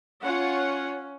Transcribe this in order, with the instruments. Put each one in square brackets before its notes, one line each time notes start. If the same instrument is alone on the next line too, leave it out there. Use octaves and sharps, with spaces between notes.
[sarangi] C#4 [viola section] F4 C#5 F#5